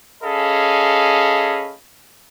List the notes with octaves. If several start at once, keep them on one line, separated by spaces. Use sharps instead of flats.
C#4 G#4 A4 D#5 F5 B5